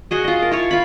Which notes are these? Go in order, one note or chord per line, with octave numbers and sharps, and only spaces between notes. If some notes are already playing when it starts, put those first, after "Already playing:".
F#4 G#4 D#5
F4 D#5
A#4 A5
E4 F4 C#5
F4 B5